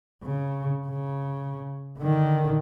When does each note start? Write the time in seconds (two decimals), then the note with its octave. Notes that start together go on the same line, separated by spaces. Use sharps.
0.23 C#3
0.87 C#3
1.98 D3 D#3